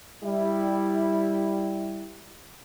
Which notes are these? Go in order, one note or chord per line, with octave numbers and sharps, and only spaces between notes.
G3 E4